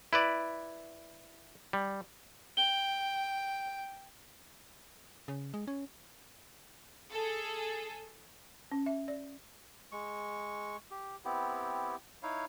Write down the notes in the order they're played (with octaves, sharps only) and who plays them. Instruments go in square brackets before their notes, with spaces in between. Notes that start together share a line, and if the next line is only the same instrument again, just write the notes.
[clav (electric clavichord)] E4 B4 D5
G3
[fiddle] G5 [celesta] G7
[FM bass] C#3
G#3
C#4
[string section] G#4 A4
[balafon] C#4
E5
D5
[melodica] G#3 C#6
G4
B3 C4 E4 G4
D#4 E4 C#5 F5